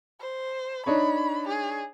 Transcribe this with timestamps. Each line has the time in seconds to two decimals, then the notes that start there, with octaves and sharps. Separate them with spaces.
0.20 C5
0.86 D4 D#4 C#5 B5
1.48 G#4